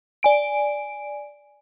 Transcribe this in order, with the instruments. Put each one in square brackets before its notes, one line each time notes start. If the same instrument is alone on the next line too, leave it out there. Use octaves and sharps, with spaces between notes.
[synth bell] D5 G#5 D7